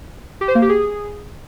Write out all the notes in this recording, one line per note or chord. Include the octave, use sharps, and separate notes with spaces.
G4
C5
A#3
G4
G#4